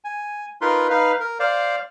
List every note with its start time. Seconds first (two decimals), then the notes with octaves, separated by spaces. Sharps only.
0.04 G#5
0.61 D#4 F4 A#4 B4 C6
0.90 D#4 B4 F5
1.20 A#4
1.40 C5 D5 F5